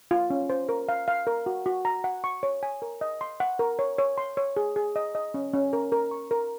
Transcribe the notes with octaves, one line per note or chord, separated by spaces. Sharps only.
F4
C#4
C5
A#4
F5
F5
A#4
F#4
F#4
A#5
F#5
C#6
C#5
G#5
A#4
D#5
C6
F#5
A#4
C#5
C#5
C6
C#5
G#4
G#4
D#5
D#5
C#4
C#4
A#4
A#4
C#6
A#4